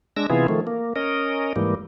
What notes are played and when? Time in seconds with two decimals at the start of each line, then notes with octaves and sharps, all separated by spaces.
0.16 G#3 D4 E6 A#6
0.30 C3 E3 B3 E4 F4 G#4
0.48 D#3 F3 A3
0.67 A#3
0.96 C#4 A#4 D#5
1.56 G#2 E3 G3 A#3